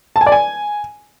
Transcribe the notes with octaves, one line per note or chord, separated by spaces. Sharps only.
A5
G#5
D5
G#5